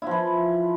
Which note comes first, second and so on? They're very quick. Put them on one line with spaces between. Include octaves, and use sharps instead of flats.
E4 F3 E3